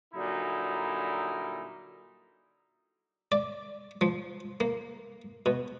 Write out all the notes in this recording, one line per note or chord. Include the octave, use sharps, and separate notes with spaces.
A#2 D3 F#3 G3 D#4 E4
D5
F3
A#3
B2